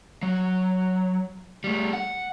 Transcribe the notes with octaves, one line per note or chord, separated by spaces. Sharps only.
F#3
G3 A3
F#5